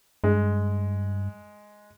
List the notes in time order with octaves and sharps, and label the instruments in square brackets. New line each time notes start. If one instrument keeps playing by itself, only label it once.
[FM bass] G2 [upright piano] G#3